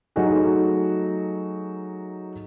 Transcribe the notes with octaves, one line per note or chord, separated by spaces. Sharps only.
F#3 A3 D#4 F#4 G#4